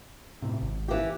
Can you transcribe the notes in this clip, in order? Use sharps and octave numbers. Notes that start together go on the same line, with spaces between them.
A2 C3
G#1
E3 G4